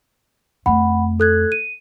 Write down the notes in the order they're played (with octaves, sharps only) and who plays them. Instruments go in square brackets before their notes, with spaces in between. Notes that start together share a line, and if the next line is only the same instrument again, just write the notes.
[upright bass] F2 A3 [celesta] F#5 B5
[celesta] A4 F#6 G#6
D#7